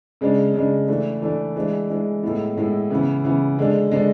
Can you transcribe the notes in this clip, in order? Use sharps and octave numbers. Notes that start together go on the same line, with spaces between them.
C#3 G#3 D4
C#3 G#3 D4
E3 A3 D4
E3 A3 D4
E3 G#3 D4
E3 G#3 D4
A2 G#3 B3 E4
A2 G#3 B3 E4
C#3 E3 B3
C#3 E3 B3
D3 G#3 D4
D3 G#3 D4